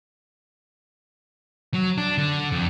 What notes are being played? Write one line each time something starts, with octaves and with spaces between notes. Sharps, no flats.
F#3
D4
D3
F2